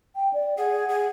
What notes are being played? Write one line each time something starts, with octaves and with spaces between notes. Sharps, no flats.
G5
D5
G#4 F#5
G#4